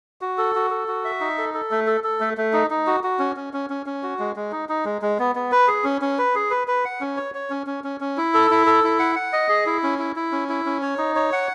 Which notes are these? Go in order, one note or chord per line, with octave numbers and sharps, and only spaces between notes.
F#4
A4
F#4
A4
F#4
E5
D#4
A4
A4
A3
A4
A4
A3
A3
D#4
D#4
F#4
F#4
C#4
C#4
C#4
C#4
C#4
F#4
G#3
G#3
D#4
D#4
G#3
G#3
B3
B3
B4
G#4
C#4
C#4
B4
G#4
B4
B4
F#5
C#4
C#5
C#5
C#4
C#4
C#4
C#4
E4
A4
E4
A4
E4
F#5
F#5
D#5
G#4
E4
C#4
E4
E4
C#4
E4
C#4
C#5
D#4
C#5
F#5